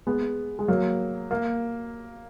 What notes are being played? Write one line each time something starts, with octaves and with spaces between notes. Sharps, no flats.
G#3 B3
G#3
F#3 A#3
A#3